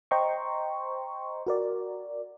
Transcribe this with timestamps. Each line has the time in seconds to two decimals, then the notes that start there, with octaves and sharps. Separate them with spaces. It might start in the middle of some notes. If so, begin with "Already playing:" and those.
0.11 C5 D#5 G5 A#5 C6 C#6
1.47 F#4 A#4 D5